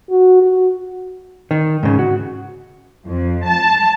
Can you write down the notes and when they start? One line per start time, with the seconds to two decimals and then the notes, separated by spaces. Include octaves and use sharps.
0.10 F#4
0.43 F#4
1.51 D#3
1.83 G#2 C#3
1.99 F#4
3.07 F2
3.46 A5